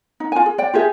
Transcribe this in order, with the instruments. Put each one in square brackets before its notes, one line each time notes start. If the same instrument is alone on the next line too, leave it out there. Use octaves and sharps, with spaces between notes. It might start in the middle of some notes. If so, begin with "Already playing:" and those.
[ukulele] D#4
F4 G#5
G#4
D5 G5
F4 G4 G#4 E5